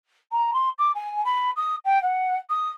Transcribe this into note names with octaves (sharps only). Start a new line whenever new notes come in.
A#5
C6
D6
G#5
B5
D#6
G5
F#5
D#6